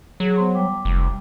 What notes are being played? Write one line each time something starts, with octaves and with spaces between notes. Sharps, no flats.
F#3 G#4
B3 C5 C6
G3 G5 D6
F1